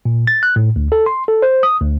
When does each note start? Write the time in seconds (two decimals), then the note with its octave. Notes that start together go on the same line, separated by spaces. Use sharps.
0.05 A#2
0.27 A6
0.43 F#6
0.56 A2
0.76 D2
0.92 A4
1.06 C6
1.28 A4
1.42 C5
1.63 D#6
1.80 D2